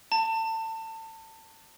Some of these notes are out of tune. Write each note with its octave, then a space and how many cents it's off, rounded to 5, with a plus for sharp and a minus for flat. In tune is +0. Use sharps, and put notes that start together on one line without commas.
A5 +30